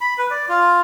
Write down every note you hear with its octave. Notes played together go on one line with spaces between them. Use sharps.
B5
B4
D5
F4